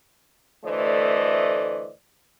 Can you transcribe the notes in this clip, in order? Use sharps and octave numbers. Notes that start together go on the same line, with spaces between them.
D2 E3 A3 C5 D5 D#5